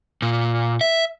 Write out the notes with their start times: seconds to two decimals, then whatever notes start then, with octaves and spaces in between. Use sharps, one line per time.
0.22 A#2
0.81 E5